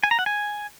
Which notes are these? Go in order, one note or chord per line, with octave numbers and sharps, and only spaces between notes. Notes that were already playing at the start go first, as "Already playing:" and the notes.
G#5
A#5
F#5
G#5